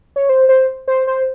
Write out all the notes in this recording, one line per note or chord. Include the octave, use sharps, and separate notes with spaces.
C#5
C5
C5
C5
C5